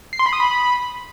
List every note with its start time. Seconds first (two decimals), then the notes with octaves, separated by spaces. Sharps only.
0.13 C7
0.19 C6
0.26 B5
0.33 D#6
0.39 B5